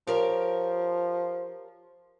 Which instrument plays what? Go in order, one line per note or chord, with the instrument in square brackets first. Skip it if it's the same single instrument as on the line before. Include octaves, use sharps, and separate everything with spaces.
[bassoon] F3 [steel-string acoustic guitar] G4 A#4 C#5